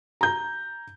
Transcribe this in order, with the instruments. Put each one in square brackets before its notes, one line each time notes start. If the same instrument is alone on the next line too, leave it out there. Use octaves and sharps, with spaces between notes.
[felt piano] A#5 G6